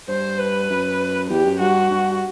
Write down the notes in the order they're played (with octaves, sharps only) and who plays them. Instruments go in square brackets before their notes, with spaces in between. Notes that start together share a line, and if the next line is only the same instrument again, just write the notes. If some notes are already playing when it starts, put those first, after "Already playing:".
[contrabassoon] G2 [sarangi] C5
[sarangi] B4
[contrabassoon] F#2
[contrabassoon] E2 [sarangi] G4
[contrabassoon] F#2
[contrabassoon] G2 [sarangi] F#4
[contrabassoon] G2